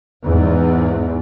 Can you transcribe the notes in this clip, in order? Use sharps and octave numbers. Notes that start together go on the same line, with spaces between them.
E2 G#2